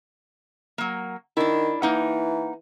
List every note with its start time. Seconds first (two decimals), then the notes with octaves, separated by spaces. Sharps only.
0.78 F#3 A#3
1.37 D#3 D4 E4
1.82 E3 A#3 D#4 F#5